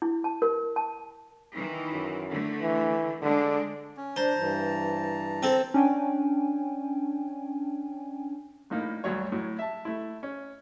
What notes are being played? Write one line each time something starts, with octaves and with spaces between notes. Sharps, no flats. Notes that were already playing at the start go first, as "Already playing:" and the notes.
E4
A5
A#4
A5
D#3 E3
F#2
D3 A3
E3
D3 G#3 D4
C#4
D4 C5 A5 A#5
G2 E3
C4 A4
C#4 D4 G5 G#5
A#1 A2 A#3 D#4
D2 G2 F#3 C#5
A2 F#3
E5 A5
A3 E4
C#4